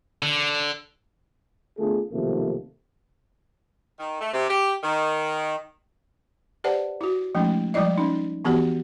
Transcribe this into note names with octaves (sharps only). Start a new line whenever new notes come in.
D3
D3 A3 B3 F4 G#4 A4
B1 C3 D#3 F3 A3 A#3
D#3
A3
C3
G4
D#3
G4 B4 C5 D5 F#5 A5
E4 F#4
F3 G#3 A3 C#4 D#4
F3 G3 G#3 E4 D5 D#5
C#4 D#4
E3 B3 F#4 G4 F#5